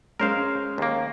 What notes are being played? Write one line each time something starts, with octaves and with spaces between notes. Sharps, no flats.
G#3 C#4 A#4 C5 F5
D#2 A#3